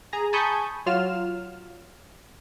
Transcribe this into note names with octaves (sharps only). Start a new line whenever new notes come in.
G#4 A#5
G#5 A5 B5 C#6 D#6 G6
F#3 F4 F6 E7